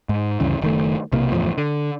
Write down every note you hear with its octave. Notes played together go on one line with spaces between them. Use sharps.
G#2
D2 G2 C#3 E3
F#1 D#3 A3
B1 C3 A#3
F#1 E2 A2 F3
D3